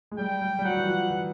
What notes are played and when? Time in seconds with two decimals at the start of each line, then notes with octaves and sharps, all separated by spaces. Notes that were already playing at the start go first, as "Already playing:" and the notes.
0.11 G#3
0.18 G3 G5
0.42 G3
0.59 G3
0.65 F#3 F#5
0.77 E3
0.87 F3
1.11 E3